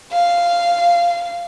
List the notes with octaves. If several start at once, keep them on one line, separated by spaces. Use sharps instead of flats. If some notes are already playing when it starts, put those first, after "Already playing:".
F5